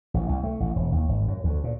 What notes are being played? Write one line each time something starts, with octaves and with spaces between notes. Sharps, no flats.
A1
C2
A3
A1
E1
D#2
G#1
F#2
D2
A#2